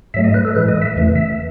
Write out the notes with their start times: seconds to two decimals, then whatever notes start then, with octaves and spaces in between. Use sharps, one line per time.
0.14 G#2 F#3 A3 E5
0.24 D#5
0.34 B4
0.45 A4
0.55 A2 E3 G#3 B4
0.68 D#5
0.82 E5
0.95 E2 C#3 E3 A3
1.16 E5